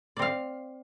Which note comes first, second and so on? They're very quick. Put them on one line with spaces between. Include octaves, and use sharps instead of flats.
D5 C4 F5